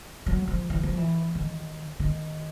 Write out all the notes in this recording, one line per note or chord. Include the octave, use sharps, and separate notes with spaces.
F#3
F3
E3
F3
E3
D#3
D#3